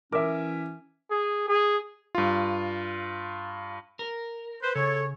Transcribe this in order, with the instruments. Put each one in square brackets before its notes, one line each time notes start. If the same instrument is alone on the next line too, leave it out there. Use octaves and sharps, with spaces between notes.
[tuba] E3 [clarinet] C#4 [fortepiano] A#4 [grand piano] E5 D6
[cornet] G#4
G#4
[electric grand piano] G2 F4
[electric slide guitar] A#4
[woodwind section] B4 C5
[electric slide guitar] C#3 [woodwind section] A4 C#5